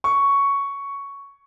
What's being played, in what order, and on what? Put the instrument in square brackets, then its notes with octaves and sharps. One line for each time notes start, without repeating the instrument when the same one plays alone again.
[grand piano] C#6